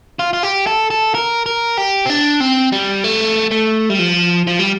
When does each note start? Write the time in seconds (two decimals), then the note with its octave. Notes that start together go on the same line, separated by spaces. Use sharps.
0.19 F4
0.33 F4
0.43 G4
0.67 A4
0.90 A4
1.15 A#4
1.46 A#4
1.78 G4
2.06 C4
2.10 D4
2.40 C4
2.72 G3
3.04 A3
3.51 A3
3.90 G3
3.99 F3
4.47 F3
4.59 G3